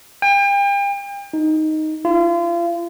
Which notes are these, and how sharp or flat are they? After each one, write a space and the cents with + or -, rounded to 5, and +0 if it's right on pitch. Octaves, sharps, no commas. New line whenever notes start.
G5 +40
D#4 +0
F4 -35